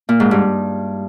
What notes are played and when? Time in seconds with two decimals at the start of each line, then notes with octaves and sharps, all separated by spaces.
0.09 A#2
0.20 G#2
0.31 G2